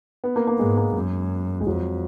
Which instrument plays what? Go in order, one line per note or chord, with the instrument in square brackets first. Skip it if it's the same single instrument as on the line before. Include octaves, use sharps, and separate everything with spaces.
[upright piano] B3
A#3
A#3
[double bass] G#2 [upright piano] G#3
[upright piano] A#3
[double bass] F#2
[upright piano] G#3
[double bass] F2 [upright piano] F#3